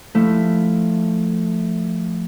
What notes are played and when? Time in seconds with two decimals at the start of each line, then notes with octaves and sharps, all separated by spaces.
0.15 F3 A3 E4